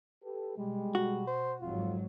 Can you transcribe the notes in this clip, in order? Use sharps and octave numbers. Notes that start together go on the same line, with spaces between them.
G4 A4 B4
B2 G3 G#3
F#4
C5
G#1 F2 G#2 F#3 F4